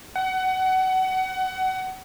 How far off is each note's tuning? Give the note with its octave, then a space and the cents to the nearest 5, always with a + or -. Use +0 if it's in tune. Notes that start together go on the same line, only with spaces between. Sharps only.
F#5 +25